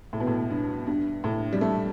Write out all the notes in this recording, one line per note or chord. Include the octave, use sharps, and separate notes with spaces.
A2
B2
A2
G2
G2
A2
G3
A3